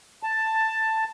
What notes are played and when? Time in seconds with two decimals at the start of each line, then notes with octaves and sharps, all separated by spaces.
0.23 A5